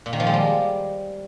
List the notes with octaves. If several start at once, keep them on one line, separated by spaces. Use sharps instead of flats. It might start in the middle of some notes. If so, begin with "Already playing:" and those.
A#2
D#3
F3
G#3
G3